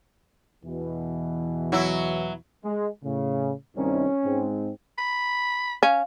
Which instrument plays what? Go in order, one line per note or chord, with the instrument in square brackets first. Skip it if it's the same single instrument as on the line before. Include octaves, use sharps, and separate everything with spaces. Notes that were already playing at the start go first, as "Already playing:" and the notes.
[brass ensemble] E2 B2 E3
[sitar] F#3 E4
[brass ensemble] G#3
A2 C#3
[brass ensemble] C2 G2 D#3 [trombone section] C#4
[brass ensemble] G#2 G#3 C4
[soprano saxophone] B5
[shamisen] C#4 [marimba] F5